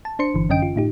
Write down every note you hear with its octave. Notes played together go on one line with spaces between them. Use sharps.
A5
D4 C5 C6 C#7
G1 D3 E3
F#2 D3 C#4 D#5 G5 D7
F4
A2 D#4 G4